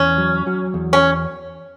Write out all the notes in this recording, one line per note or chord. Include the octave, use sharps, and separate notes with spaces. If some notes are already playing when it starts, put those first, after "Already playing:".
Already playing: E2 C#4
F#3
F#3
E2
C#4